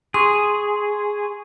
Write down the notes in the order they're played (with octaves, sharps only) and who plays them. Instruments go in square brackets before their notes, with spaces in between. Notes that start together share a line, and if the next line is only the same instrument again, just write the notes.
[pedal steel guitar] G#4 [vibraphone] C6 C#6